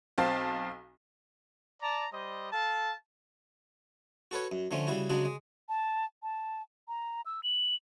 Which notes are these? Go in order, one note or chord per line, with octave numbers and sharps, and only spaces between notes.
B1 C4 F5 A5
D5 A5 A#5
G3 C5 D#5
A4 F5 A5
F#4 A4 B4 C#5
F#2
D3 F3 A3 C#4
C#3 G3 E4 F#4
C#3 F#3 G#3 D4 F#4
G#3
A5
A5
A#5
E6
F#7